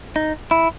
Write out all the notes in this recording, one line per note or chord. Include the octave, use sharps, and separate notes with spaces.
D#4
E4